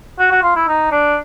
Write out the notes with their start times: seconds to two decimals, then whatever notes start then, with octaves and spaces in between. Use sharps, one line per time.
0.19 F#4
0.31 F#4
0.43 F4
0.56 E4
0.68 D#4
0.91 D4